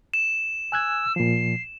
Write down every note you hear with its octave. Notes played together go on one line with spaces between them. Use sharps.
E7
G#5 E6 F#6 G#6
A#2 F3 C7